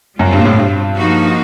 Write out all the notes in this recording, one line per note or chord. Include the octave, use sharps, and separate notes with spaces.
F#2 B2 G3 C4 F4
G2
A#2
A2
G2
F3 A#3 D#4 F#4